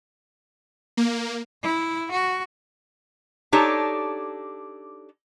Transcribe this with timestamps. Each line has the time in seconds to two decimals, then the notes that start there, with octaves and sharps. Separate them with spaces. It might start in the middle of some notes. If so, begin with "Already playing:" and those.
0.97 A#3
1.63 E4
2.12 F#4
3.52 D4 D#4 G4 A4 C#5